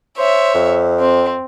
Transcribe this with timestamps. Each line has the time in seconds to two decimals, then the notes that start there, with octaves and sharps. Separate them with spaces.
0.18 C5 C#5 E5
0.55 F2
1.00 C4